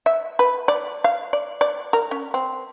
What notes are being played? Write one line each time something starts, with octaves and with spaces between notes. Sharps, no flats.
E5
B4
D5
F5
D5
D5
A#4
C#4
C4